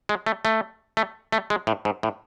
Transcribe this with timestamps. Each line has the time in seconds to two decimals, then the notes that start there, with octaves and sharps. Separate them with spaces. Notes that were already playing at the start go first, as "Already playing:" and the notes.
0.09 G#3
0.26 A3
0.45 A3
0.97 A3
1.32 A3
1.50 G#3
1.67 A2
1.85 G#2
2.03 A2